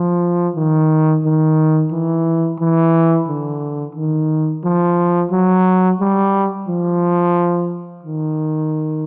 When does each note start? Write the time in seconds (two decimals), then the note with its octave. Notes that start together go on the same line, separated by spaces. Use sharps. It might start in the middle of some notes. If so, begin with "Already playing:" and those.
Already playing: F3
0.56 D#3
1.24 D#3
1.92 E3
2.59 E3
3.28 D3
3.95 D#3
4.64 F3
5.31 F#3
6.00 G3
6.67 F3
8.03 D#3